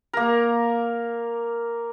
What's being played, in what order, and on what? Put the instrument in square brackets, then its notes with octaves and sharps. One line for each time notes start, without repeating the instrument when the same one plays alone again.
[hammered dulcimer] A#3 A#4